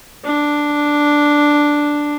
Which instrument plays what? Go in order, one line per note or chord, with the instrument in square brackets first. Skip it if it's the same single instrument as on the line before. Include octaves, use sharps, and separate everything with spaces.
[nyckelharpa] D4